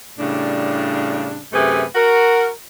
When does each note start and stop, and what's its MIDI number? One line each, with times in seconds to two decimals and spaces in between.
0.19 1.41 45
0.19 1.41 49
0.19 1.41 55
0.19 1.41 62
1.52 1.84 42
1.52 1.84 48
1.52 1.84 57
1.52 1.84 68
1.52 1.84 71
1.95 2.49 66
1.95 2.49 70